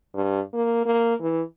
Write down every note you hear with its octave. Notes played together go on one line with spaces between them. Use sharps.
G2
A#3
A#3
E3